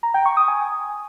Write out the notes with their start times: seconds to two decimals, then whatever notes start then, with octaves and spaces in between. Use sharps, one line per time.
0.03 A#5
0.14 G5
0.26 C#6
0.37 D#6
0.48 G#5